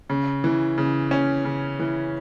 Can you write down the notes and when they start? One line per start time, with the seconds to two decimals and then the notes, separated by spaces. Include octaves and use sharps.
0.10 C#3
0.44 E3
0.78 C#3
1.11 C#4
1.45 C#3
1.80 E3